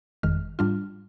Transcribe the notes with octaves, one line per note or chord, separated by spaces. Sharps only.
G1 F2 D#3 G#3 F6
G#2 G3 D4 F4 F6